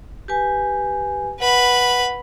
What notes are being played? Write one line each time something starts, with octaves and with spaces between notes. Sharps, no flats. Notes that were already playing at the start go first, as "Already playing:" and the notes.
G4 B4 G#5
B4 F#5 B5